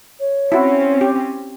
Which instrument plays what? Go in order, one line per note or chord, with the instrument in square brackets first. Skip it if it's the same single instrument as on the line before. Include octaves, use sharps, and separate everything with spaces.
[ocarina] C#5
[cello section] C4 C#4 [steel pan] E4 F#4
[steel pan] G4